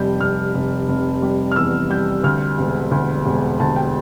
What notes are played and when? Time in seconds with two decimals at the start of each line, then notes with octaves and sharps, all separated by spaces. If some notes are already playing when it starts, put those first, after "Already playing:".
Already playing: F1 G3 G6
0.21 F1 F6
0.54 F1
0.89 F1
1.22 G3
1.52 F6
1.56 E2 E6
1.90 G3 G6
2.23 D2 F6
2.58 E1
2.91 D2
3.26 E1
3.60 D2 A5
3.76 G5